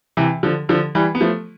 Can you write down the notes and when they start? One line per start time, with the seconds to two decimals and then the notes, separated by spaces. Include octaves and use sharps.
0.17 C3 E3
0.43 D3 F3
0.69 D3 F3
0.95 E3 G3
1.15 B3
1.21 F3 A3